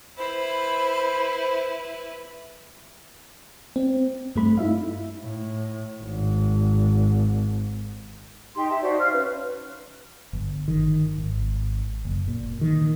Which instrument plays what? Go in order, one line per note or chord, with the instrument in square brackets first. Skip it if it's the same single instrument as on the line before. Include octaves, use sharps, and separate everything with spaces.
[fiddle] E4 B4 [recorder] C5 [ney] B5
[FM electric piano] C4
G2 A3 B5
D#4 E4 E5 F5
[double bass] A2
G#1
[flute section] D#4 G4 C6
E5 A5
D#4 F#4 C5 D5
F5 F6
C#4 B4
[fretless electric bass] G1
D#3
G#1
F#1
A#2
D#3